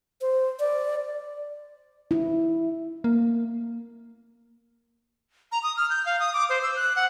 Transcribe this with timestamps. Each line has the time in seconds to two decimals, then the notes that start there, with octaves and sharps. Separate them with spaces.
0.21 C5
0.60 D5
2.11 E4
3.04 A#3
5.52 A#5
5.63 D#6
5.77 F6
5.90 G6
6.06 F5
6.20 D#6
6.34 D6
6.49 C5
6.63 E6
6.76 F#6
6.96 F#5